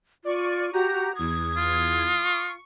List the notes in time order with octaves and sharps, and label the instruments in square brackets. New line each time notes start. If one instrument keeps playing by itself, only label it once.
[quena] F4 [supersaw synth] D5 C#6 D#7
[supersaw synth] F#4 A#5 [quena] G4
[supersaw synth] E2 G#6 [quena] D#6
[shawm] F4
[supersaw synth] C#6